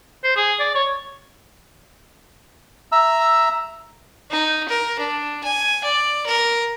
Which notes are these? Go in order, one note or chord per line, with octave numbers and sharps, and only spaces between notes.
C5
G#4
D5
C#5
E5 A#5 E6
D#4
A#4
D4
G#5
D5
A#4